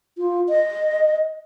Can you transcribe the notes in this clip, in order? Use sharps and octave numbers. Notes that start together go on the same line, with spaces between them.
F4
D#5